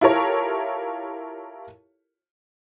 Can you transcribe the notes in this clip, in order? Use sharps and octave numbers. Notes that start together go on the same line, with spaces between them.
E4 F4 G4 A4 A#4 C#5